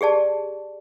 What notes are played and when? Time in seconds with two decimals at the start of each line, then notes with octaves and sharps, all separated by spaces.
0.01 G4 G#4 D5 A5